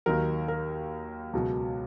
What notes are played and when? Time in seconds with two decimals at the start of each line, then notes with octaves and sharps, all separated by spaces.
0.06 D#2 D#3 F#3 A#4
0.48 A#4
1.33 C#2 B2 F#3